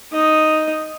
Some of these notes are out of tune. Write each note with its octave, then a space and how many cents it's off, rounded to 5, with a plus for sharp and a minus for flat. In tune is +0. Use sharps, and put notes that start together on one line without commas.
D#4 +0 D#5 +0